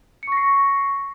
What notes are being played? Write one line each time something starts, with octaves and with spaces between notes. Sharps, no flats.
C#6 A#6 C7 C#7